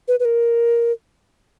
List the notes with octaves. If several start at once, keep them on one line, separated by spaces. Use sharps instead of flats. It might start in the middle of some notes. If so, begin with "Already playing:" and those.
B4
B4
A#4